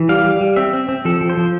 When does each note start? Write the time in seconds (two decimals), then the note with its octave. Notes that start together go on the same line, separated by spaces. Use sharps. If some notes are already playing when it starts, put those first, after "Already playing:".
Already playing: E3
0.09 G3 F5
0.24 G3
0.41 G3
0.56 C4 E5
0.73 C4
0.89 C4
1.05 F3 A4
1.21 F3
1.30 C5
1.37 F3